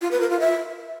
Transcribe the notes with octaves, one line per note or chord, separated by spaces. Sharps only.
F4
B4
A#4
F4
E5